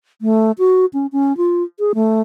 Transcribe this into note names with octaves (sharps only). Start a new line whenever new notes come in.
A3
F#4
C#4
C#4
F4
G#4
A3